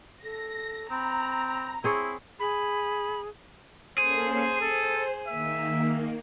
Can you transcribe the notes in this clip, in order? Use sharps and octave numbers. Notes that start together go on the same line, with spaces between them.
A4 A#6
C4 A#5 B5
C4 E4 G#4 C#5
G#4 B5
A#3 C#4 G#4 A4 C5
A4 C5
D#3 A#3 E5